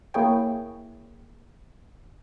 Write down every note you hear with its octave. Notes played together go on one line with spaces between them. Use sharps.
A#3 E4 G#4 C#5 G5